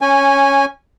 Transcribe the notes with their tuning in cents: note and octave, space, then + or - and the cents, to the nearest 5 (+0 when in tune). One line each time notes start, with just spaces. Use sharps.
C#4 +0 G#5 -15